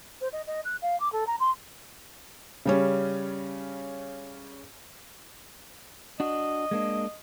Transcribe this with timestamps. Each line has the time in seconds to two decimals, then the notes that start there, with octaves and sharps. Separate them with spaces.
0.21 C5
0.32 D#5
0.47 D#5
0.65 F#6
0.82 F5
1.00 D6
1.12 A4
1.27 A#5
1.40 C6
2.66 C#3 G3 C#4
6.20 D4 F#4 D#5
6.71 G#3 A#3 D4